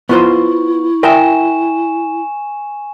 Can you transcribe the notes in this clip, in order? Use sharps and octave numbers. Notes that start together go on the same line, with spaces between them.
B3 E4 F4 C5 C#6
A#4 E5 G5 G#5 E7